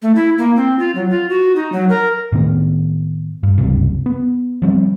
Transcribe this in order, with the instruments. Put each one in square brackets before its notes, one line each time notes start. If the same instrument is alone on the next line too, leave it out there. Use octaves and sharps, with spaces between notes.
[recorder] A3
E4
A#3
C4
F4
F#3
F4
F#4
D#4
F#3
A#4
[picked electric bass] A2 D#3 B3
G2
F#1 C#2 G2 C3
B3
F3 G3 C4